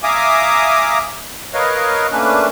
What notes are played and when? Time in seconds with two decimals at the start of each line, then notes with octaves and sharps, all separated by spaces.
0.03 E5 F5 G#5 A#5 D6 D#6
1.54 A#4 B4 C#5 D#5 F5
2.12 A3 A#3 C#4 D4 B4